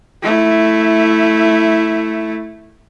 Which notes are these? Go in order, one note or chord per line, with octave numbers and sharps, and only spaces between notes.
A3 E4